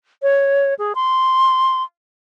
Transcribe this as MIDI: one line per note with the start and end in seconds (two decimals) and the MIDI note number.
0.22 0.74 73
0.79 0.93 68
0.95 1.83 84